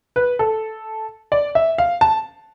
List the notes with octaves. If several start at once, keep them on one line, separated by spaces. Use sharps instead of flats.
B4
A4
D5
E5
F5
A5